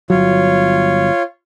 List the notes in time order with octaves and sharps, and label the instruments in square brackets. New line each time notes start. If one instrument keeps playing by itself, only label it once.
[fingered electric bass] G1 F#3 [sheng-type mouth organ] F4 C#5